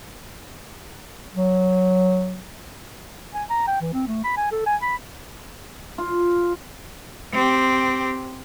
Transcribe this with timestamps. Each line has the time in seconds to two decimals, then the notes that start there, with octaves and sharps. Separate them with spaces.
1.35 F#3
3.34 G#5
3.50 A#5
3.67 G5
3.81 E3
3.93 C4
4.08 A3
4.24 B5
4.37 G#5
4.52 A4
4.67 G#5
4.82 B5
5.98 F4
7.33 C4 G4